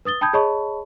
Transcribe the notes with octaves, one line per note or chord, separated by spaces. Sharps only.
B4 D#6 A6 G7
G5 A5 B5 D#6 G6 G#6
G#4 C#5 D#5 A5 B5 C#6